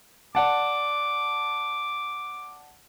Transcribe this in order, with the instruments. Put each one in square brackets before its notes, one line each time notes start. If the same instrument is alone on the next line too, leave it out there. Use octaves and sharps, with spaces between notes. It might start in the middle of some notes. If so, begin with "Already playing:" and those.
[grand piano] D5 F#5 A5 [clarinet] D6